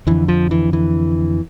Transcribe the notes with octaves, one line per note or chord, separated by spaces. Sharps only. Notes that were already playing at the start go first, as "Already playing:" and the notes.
F2 D3 E3
F3
E3
E3